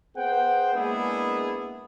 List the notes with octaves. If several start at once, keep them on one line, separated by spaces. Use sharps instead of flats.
B3 G#4 C5 F#5 G5
G#3 A#3 B3 D4 E4 G#4